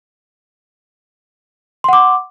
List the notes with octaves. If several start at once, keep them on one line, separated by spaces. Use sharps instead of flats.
F#5 C6 D6